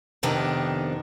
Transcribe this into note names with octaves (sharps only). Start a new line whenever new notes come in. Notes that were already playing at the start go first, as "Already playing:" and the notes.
F2 C3 D#3 B3 D4